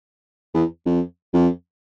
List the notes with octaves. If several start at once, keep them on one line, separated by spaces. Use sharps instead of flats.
E2
F2
F2